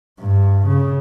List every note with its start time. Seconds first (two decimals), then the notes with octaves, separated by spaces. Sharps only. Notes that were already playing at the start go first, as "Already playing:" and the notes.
0.19 G2
0.67 C#3